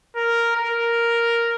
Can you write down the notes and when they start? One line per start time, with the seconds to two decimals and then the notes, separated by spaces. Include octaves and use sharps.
0.16 A#4
0.56 A#4